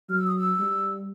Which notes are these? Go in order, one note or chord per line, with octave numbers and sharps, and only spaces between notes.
F#3 F6
E6
D#6
E6
G3